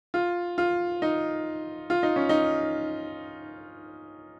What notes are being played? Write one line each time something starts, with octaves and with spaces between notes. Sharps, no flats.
F4
F4
D#4
F4
D#4
C#4
D#4